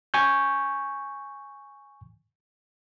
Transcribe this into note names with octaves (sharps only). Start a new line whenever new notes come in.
G#5 C#6 G6